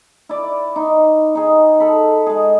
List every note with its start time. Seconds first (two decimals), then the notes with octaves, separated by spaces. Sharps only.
0.29 E4 D5
0.76 D#4
1.35 D#4 G#4
1.80 A4 B5
2.26 G#3 G#4